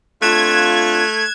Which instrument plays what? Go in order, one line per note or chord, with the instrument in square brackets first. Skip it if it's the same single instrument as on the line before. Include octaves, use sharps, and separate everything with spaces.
[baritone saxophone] A3 [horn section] C4 D4 F4 [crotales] F#6 E7 [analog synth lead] G#6